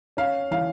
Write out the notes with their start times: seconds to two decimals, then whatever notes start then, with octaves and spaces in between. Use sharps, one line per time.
0.17 C#4 F5
0.51 E3 F5